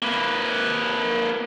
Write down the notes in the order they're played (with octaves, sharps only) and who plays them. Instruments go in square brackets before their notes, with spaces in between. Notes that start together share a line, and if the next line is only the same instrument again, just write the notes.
[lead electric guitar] A#3 B4